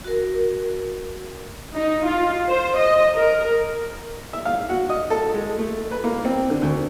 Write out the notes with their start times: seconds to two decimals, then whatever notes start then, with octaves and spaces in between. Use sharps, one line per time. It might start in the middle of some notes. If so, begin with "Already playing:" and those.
0.04 F#4 A#4
1.75 D#4
2.05 F4
2.48 C5
2.77 D#5
3.14 A#4
4.33 E5
4.45 F5
4.69 F#4
4.90 D#5
5.10 A4
5.34 G#3
5.58 A3
5.91 B4
6.04 A#3
6.25 C4
6.50 D3
6.62 D2